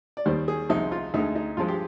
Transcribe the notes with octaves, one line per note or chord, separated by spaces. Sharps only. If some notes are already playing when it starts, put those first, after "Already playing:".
D5
D#2 D#3 G3 C5
G#4
C2 C3 F3 G#3 D#4
F4
D2 D3 G#3 D#4
D#4
G2 F3 G#3 F4
G4